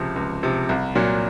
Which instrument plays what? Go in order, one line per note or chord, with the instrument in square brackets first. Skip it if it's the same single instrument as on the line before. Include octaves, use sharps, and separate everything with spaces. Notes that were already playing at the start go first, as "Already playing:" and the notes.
Already playing: [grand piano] C#2 C3 F3
C#2
C3 F3
C2
A#2 F#3